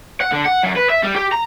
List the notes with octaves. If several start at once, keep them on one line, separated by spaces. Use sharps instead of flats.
F#5
D3
F#5
F#2
B4
E5
G3
G4
A#5